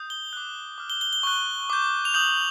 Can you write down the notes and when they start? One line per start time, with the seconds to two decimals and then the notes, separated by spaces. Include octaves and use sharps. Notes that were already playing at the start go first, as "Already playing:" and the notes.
Already playing: D#6 G6
0.10 G7
0.33 D6 F#6
0.78 D6 F6
0.90 G7
1.01 G7
1.13 G7
1.23 C#6 F#6
1.70 D6 G6
2.05 F7
2.14 D#6 G6 F#7